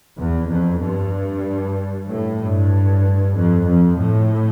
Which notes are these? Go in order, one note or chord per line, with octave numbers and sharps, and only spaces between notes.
E2
F2
G2
A2
G2
F2
F2
A2